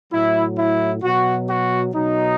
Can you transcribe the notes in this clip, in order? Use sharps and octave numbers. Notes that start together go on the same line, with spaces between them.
A2 F#3 E4
E4
B2 F#3 F#4
F#4
B2 F#3 D#4